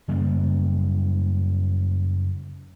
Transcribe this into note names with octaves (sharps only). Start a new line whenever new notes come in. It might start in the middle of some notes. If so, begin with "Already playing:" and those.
F#2 C#3 G3 A#3